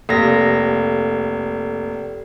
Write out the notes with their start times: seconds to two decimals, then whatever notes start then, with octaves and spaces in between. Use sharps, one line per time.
0.09 F1 A#3 G4 A4 A#6